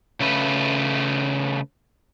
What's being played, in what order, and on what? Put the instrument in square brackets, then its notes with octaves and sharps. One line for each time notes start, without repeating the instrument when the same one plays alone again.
[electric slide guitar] C#3 A3 B4